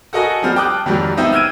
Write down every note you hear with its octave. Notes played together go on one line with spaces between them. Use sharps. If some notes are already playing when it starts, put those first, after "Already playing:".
F#4 A4 A#4 D#5 F#5 G#5
F3 G3 C4 F6
G5 A5 D6 D#6 F#6
F2 G#2 D#3 F#3 G3
B3 C4 D#4 E5
E6 F6 G6 G#6 D7 D#7